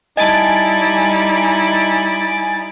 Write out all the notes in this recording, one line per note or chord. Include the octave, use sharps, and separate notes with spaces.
G3 D#4 E4 D#5 G#5 A5 A6 D7